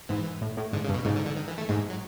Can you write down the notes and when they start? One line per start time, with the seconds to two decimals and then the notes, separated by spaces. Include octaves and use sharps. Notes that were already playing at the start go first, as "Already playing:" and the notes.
0.09 G#2 E3
0.41 A2
0.57 A2
0.73 G#2 D3
0.84 C#3
0.89 G2
0.94 B2
1.05 G#2 C#3
1.16 D3
1.26 D3
1.36 D#3
1.48 E3
1.58 A3
1.69 G#2 G#3
1.90 F#3